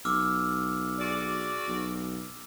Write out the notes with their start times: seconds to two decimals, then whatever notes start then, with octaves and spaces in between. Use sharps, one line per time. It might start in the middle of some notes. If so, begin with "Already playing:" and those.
0.05 B1 D6 E6 F6
0.99 F#4 G#4 D5
1.68 B1